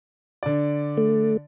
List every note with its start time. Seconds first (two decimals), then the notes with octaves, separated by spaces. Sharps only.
0.43 D3 D5
0.97 A3